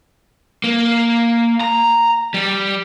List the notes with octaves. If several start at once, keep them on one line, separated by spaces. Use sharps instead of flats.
A#3
A#5
G3